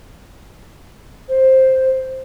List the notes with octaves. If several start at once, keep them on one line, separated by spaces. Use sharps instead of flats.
C5